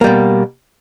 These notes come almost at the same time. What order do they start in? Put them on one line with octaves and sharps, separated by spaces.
A#3 G3 B2